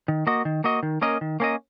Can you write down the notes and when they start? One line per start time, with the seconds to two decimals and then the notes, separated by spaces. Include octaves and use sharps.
0.08 D#3
0.27 A#3 F#4 D#5
0.45 D#3
0.64 A#3 F#4 D#5
0.83 D#3
1.02 A#3 C#4 A#4 D#5
1.21 D#3
1.40 A#3 C#4 A#4 D#5